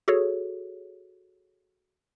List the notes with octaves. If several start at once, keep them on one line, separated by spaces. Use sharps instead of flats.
F#4 G#4 A4 C#5